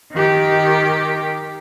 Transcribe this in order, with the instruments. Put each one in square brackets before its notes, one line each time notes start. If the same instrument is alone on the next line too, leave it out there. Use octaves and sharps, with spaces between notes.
[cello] D#3 G4